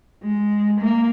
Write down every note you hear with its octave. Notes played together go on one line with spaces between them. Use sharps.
G#3
A#3